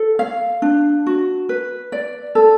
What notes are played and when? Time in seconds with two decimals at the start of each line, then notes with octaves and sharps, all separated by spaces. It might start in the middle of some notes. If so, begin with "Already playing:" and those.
Already playing: A4
0.19 F5
0.62 D4
1.06 F#4
1.49 B4
1.92 D5
2.35 A4